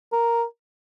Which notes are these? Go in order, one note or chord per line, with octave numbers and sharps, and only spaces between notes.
A#4